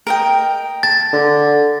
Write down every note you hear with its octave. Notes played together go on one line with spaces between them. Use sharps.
A#4 D#5 G5
A5 A6
D3